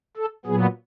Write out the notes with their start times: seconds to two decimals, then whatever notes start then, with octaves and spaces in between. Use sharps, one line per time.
0.17 A4
0.46 A#2 F#3 B3 G#4